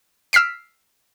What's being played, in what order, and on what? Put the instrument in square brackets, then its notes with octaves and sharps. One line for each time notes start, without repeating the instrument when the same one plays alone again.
[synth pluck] E6 F6 B6 C7 D7